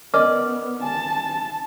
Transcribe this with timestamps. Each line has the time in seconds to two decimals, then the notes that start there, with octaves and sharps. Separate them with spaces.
0.14 B3 C#4 A#4 D5 D#5 D6 F6
0.82 G#5 A5